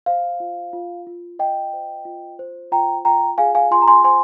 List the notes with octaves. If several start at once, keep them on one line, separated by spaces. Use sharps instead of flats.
C5 F5
F4
F4
F4
F4 D#5 G5
C5
F4
C5
F4 G5 A#5
F4 G5 A#5
G#4 F5 G#5
F5 G#5
F4 G#5 C6
A#5
G#5 C6
C5 G#5 C6